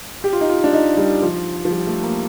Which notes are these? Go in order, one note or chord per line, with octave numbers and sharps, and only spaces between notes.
G4
F4
D#4
F4
D4
D#4
G3
F3
F3
G3
A3
A#3